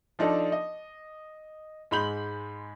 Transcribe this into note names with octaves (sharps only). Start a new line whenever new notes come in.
F3 D4 D#4 A4
D#5
G#2 G#3 B5 G6 F#7